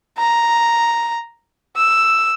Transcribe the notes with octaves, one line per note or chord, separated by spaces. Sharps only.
A#5
E6